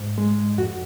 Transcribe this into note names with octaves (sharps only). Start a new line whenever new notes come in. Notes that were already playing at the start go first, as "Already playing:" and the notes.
Already playing: G#2
G#3
F2 F#4